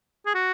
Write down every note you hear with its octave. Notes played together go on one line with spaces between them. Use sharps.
G#4
F#4